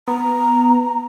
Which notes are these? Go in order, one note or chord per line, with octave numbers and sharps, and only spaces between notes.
B3 A#5